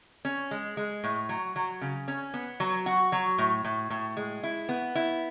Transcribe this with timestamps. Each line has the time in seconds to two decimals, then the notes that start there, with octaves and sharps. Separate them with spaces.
0.25 C#4
0.51 G#3
0.77 G#3
1.04 A2
1.29 F#3
1.56 F#3
1.81 C#3
2.08 C#4
2.34 B3
2.60 F#3
2.86 F#4
3.12 F#3
3.38 A2
3.65 A2
3.90 A2
4.17 G#3
4.43 E4
4.69 B3
4.95 E4